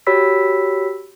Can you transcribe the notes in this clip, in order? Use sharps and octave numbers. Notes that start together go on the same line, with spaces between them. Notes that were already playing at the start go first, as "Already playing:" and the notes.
F#4 G4 C#5 B5 E6 B6